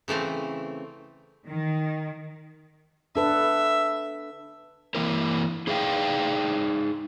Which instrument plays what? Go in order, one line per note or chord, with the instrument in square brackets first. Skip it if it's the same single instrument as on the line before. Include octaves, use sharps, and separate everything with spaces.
[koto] C#3 E3 A3 C4
[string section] D#3
[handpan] D4 A4 B4 [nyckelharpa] E5
[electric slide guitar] E3 A#3 E4 A#4
D#4 G#4 D5 E5 F5 G5